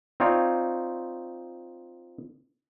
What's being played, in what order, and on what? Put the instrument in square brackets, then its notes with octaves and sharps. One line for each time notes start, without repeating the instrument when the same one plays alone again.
[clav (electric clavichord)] C4 D#4 F4 C#5 D5